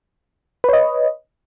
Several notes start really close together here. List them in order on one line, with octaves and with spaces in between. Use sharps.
B4 C#5 D#5